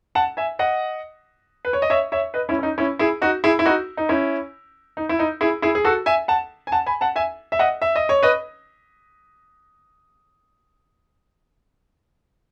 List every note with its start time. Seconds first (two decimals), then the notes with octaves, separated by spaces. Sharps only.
0.15 F#5 A5
0.37 E5 G#5
0.59 D#5 F#5
1.65 B4
1.73 C#5
1.82 D#5
1.90 C#5 E5
2.12 C#5 E5
2.34 B4 D#5
2.49 C#4 E4
2.59 C#4
2.63 D#4
2.78 C#4 E4
2.99 E4 G#4
3.22 D#4 F#4
3.44 E4 G#4
3.59 E4
3.66 D#4 F#4
3.97 D#4
4.09 C#4 E4
4.97 D#4
5.09 E4
5.19 D#4
5.41 E4 G#4
5.62 E4 G#4
5.75 G#4
5.84 F#4 A4
6.06 E5 G#5
6.28 F#5 A5
6.67 G#5
6.72 F#5 A5
6.86 G#5 B5
7.01 F#5 A5
7.16 E5 G#5
7.52 E5
7.59 D#5 F#5
7.82 E5
7.95 D#5
8.09 C#5
8.23 B4 D#5